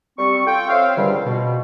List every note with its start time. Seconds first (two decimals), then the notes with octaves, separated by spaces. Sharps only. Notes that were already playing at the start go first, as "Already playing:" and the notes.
0.19 G3 C4 C#6
0.46 F4 A4 G5
0.69 C4 C5 C#5 E5 F5
0.97 C#2 G2 D3 D#3 G3
1.25 B2